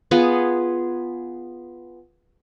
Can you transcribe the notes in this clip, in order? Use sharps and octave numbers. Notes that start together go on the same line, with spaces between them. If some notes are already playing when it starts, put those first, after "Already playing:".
B3 F4 G#4 F#5